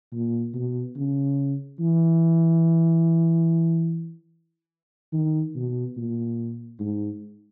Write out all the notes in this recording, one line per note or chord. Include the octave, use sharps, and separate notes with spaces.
A#2
B2
C#3
E3
D#3
B2
A#2
G#2